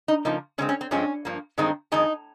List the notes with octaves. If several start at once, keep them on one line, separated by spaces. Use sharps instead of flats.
D#4
C#3 F3 A#3 D#4
C#3 G#3 C4 C#4
C#4
C4
G2 F3 G#3 C4 C#4
G2 F3 A#3
G2 D#3 G#3 C4 D#4
F2 D#3 G#3 D#4